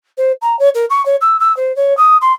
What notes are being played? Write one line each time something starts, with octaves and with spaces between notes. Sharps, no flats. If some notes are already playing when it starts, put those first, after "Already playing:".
C5
A#5
C#5
A#4
C#6
C#5
E6
E6
C5
C#5
D#6
C6